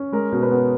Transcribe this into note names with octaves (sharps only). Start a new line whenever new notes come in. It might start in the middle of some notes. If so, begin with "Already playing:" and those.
Already playing: C#4
G#3 A#4
B2
B4
B3